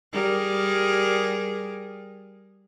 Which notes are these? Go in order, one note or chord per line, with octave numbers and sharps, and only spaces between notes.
G3 G#4 A#4